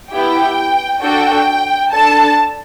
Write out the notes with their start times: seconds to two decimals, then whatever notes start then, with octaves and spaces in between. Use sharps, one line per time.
0.11 B3 E4 G4 G5
1.01 D4 F#4 A4 G5
1.92 D4 A4 A5